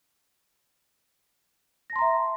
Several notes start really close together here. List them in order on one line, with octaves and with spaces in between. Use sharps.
A#6 A5 C6 A#5 E5